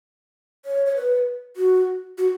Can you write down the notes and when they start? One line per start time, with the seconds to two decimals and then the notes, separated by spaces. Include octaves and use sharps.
0.65 C#5
0.86 C#5
0.96 B4
1.56 F#4
2.18 F#4